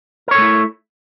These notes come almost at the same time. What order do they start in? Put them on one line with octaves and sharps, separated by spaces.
A#4 C#5 A4 A3 E4